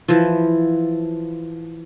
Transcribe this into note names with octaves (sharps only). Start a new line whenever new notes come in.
E3 F3